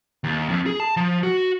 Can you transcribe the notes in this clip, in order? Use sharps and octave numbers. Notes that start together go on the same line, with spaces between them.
D#2
F2
G#4
A5
F3
F#4